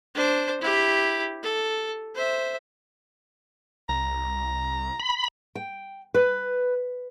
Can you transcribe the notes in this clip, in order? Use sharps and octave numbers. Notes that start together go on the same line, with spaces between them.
D4 C5
E4 G4
A4
C5 E5
C2 A#5
B5
G5
B4